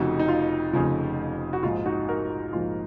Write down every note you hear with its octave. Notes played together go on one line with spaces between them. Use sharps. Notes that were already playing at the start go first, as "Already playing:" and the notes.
Already playing: F1 F2 C#3 F3 D#4 F#4
D#4
F4
F1 F2 C#3 F3
F#4
A#1 G#2 F3 F4
D#4 F#4
F#4 A#4
A#1 G#2 F3 F4